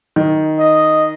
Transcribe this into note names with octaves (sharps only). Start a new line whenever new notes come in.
D#3
D#5